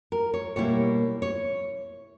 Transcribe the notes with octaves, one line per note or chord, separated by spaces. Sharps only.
A#4
C#5
B2 G3 A#3 E4 C#5
C#5